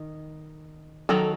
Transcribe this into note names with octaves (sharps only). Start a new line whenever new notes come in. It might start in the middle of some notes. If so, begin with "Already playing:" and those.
Already playing: D#3
D#3 F#3 A4